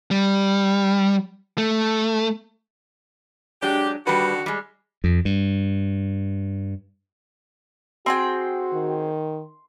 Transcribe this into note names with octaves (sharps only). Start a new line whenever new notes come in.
G3
A3
F#3 G#3 D4 G4
D3 D#3 G3 F#4 B4
G3 G#3
F2
G2
C4 F#4 G#4 G5 C6
D#3